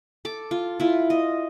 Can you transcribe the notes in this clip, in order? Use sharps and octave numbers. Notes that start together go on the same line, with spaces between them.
A4 D6
F4
E4 F4
D#5